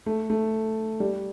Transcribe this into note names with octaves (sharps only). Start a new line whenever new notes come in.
A3
A3
G3